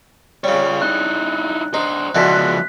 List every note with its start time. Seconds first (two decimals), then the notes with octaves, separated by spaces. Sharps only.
0.44 C#3 G3 F4 C#5
0.82 D#4 E4 F#6
1.74 D4 D#4 C5
2.15 C#2 B2 D3 E3 F3 F#6 B6